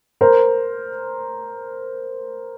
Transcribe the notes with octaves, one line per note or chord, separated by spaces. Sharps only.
A#4 C5